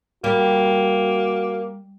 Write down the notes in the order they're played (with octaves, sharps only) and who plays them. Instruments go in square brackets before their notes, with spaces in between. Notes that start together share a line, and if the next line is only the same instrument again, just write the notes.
[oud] G3 [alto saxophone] A#3 [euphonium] F#4